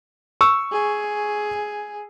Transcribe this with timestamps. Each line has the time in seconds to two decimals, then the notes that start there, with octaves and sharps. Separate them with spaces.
0.41 C#6 E6
0.72 G#4